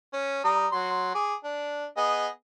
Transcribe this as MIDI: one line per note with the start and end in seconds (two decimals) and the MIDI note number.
0.13 0.44 61
0.44 0.67 55
0.44 0.67 82
0.44 0.67 87
0.72 1.10 54
0.72 1.10 84
1.15 1.34 68
1.15 1.34 86
1.44 1.85 62
1.97 2.28 59
1.97 2.28 68
1.97 2.28 75